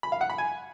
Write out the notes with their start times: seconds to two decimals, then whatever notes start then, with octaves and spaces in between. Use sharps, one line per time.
0.03 B5
0.12 F5
0.21 F#5
0.30 B5
0.38 G#5